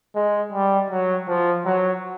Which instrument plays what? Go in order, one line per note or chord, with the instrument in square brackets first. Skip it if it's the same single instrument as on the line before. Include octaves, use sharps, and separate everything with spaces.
[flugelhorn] G#3
G3
F#3
F3
F#3